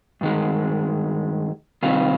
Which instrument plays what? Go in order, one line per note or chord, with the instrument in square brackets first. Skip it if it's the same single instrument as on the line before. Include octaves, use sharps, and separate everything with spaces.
[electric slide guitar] G2 D#3 G#3
C3 D#3 G3 C4 F4